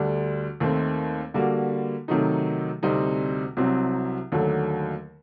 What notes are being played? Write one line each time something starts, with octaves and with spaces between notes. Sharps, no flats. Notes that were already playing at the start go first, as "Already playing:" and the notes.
Already playing: D2 D3 G3 D4
D#2 D#3 A3 C4
D3 G3 A#3 F#4
C3 D#3 F#3 A3 D#4
D2 C3 G3 C4 D#4
C2 C3 F#3 C4
D#2 D3 F#3 A3